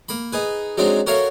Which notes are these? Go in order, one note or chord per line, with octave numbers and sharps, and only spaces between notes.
A#3 B5
D#4 G#4 B4
F#3 G#3 C4 D4 D#4
F#4 A4 A#4 C#5 E5 F5